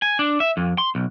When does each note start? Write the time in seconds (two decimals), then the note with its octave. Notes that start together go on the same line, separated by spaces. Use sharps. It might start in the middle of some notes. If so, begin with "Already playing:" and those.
0.02 G#5
0.19 D4
0.40 E5
0.57 F2
0.78 C6
0.95 B1